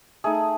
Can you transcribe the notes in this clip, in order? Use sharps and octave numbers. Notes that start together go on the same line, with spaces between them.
A3 D#4 G#4